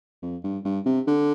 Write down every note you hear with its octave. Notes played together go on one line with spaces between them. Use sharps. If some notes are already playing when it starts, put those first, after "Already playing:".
F2
G2
G2
C3
D3